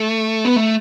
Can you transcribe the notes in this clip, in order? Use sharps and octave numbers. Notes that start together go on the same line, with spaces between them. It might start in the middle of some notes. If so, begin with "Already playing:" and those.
Already playing: A3
B3
A3